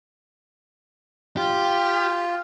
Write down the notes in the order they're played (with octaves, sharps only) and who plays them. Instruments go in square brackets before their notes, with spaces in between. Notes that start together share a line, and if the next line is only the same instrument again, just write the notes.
[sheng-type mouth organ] F4 [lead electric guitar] G4